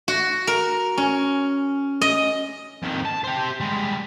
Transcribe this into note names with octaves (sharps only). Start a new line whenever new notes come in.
F#4
A#4
C#4
D#5
F2 D#3
A5
G4 C5
G3 G#3